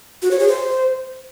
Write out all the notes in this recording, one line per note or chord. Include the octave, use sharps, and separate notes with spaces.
F#4
C#5
G#4
C5